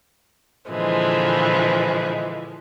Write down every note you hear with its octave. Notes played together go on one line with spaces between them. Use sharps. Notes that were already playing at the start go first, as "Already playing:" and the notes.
A#2 D3 E3 F3 G#3